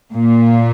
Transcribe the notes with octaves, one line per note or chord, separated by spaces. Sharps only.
A#2